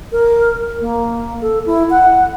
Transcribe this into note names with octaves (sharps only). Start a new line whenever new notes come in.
A#4
A#3
A4
E4
F#5